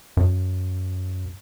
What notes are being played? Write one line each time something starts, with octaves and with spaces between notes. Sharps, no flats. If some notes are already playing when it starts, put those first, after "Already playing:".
F#2